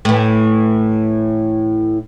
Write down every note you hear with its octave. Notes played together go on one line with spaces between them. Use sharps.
A2 E3